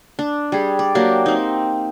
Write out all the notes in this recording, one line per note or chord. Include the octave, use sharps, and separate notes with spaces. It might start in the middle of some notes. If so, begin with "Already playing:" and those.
D4
G3 G#4
D5
F#3 A#3 D4 G4
C4 D#4